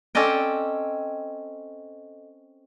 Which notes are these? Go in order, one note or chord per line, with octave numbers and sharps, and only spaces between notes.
C4 C#4 A4 D5 D#5 G5